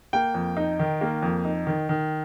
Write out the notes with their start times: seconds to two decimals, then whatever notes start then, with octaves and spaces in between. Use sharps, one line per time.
0.13 A#3 G5
0.34 F2
0.57 D#4
0.79 D#3
1.01 A#3
1.22 F2
1.45 D#4
1.67 D#3
1.89 D#3